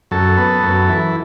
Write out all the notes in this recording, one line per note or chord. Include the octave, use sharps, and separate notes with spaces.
F#2 A4
B3
F#2
E3